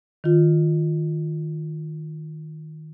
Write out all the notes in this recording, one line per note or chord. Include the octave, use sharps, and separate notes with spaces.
D#3 F4